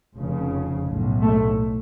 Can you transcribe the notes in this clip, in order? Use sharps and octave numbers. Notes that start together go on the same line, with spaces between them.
F1 F2 C#3
B1 A2
A3